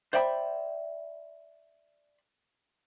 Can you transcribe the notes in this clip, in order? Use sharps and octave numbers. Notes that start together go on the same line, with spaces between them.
C5 D5 E5 G5 A5 B5